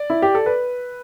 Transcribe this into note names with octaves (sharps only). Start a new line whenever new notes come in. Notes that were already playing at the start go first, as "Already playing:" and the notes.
Already playing: D5
E4
G4
A4
B4